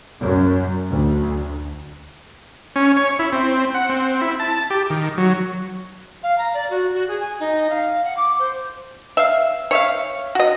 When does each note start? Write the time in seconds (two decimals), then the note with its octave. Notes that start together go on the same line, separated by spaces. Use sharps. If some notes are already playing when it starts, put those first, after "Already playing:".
0.22 F#2
0.90 D2
2.76 C#4
2.97 C#5
3.19 E4
3.33 C4
3.74 F#5
3.89 C4
4.21 E4
4.40 A5
4.70 G4
4.90 D#3
5.18 F#3
6.23 F5
6.38 A#5
6.54 D5
6.70 F#4
6.94 F#4
7.08 G#4
7.20 G#5
7.40 D#4
7.70 F5
8.04 F#5
8.17 D6
8.39 C5
9.17 E5 F5
9.71 C#5 E5 F5
10.35 F#4 D#5